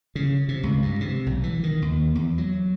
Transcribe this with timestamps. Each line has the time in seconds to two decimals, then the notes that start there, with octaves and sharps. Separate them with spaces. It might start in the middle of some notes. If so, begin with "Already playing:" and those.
0.15 C#3
0.49 C3
0.63 C#2
0.82 G2
1.01 C3
1.26 B1
1.43 E3
1.63 D#3
1.82 D#2
2.15 E2
2.38 F#3